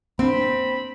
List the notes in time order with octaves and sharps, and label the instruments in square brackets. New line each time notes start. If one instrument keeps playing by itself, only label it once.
[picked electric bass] A#3 D4 [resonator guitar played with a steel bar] C4 [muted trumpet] B5